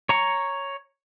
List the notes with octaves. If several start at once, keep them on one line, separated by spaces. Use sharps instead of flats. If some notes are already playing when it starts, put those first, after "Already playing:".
C#5 A#5 C#6